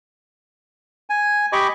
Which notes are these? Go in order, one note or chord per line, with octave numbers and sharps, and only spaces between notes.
G#5
G4 D#5 B5 C#6 D6